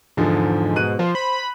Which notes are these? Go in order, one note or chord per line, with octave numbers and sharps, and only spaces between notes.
E2 G#2 D3 F3
B2 F#6 D#7
F3 C5
B5